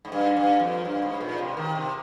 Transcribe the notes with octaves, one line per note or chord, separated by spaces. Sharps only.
G#2
G2
G2
F2
G2
G#2
A#2
C3
D#3
C3